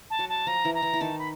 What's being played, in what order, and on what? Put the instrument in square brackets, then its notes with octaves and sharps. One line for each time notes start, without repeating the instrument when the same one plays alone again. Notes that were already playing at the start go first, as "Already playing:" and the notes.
[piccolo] A5
[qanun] F#3 F#4
[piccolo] A5
[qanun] F3 F4 [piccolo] A#5
[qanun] E3 E4
[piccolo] A#5
[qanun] E3 E4
E4
[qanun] D#3 D#4 [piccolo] A5
[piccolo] B5